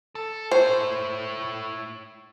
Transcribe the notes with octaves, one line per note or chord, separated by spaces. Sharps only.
A4
E4 C5 C#5